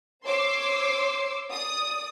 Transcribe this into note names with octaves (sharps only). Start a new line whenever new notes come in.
C5 C#5 C6 D6 E6
D5 D#6